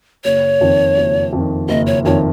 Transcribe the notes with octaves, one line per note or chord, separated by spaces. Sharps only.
F#1 C#5
F2 D#3
F#1
F2
D#3
F#1 D#5
C#5
F2 D#3 C#5